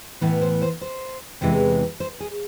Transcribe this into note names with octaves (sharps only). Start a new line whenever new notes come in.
A2 E3 B3 E4
C5
C5
C5
E2 C3 E3 G#3
C5
G#4